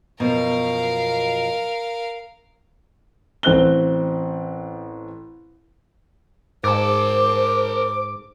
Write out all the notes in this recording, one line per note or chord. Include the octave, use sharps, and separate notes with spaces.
F#2 B2 F3 A#4 F5
A1 C4 F#6 G7
G#2 A#4 C5 A5 D6